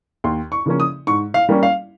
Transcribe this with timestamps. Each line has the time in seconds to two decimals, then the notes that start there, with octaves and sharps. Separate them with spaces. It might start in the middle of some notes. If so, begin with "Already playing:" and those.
0.24 D#2 C6
0.52 C#6
0.66 C#3 F3 A#3 C#4
0.80 D#6
1.07 G#2 C#6
1.34 F5
1.49 G3 A#3 C#4
1.63 F5